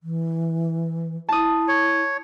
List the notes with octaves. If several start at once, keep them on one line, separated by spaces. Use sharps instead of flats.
E3
E4 A5 D#6
C#5